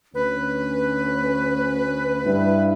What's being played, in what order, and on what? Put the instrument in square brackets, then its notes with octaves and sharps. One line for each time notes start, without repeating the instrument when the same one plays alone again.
[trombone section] D2 C#4 [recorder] B4
[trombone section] G2 E4